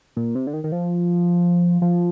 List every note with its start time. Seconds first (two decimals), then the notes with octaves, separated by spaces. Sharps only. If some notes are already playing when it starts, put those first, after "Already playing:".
0.16 A#2
0.35 C3
0.47 D3
0.53 D#3
0.64 D#3
0.72 F3
1.82 F3